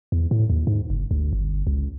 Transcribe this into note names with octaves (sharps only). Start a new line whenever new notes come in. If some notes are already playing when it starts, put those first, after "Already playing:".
E2
A2
D#2
G#2
F#1
D2
G1
C#2